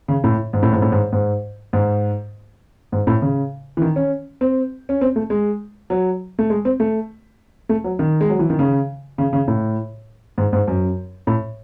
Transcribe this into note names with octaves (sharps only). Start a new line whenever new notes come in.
C#3
A2
G#2
A2
G#2
A2
G#2
G#2
G#2
G#2
A2
C#3
E3
D#3
C#4
C4
C#4
C4
A3
G#3
F#3
A3
G#3
C4
A3
A3
F#3
D#3
G#3
F#3
E3
D#3
C#3
C#3
C#3
A2
G#2
G#2
F#2
A2